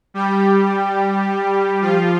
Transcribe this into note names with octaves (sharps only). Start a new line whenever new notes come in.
G3 G4
F3 F4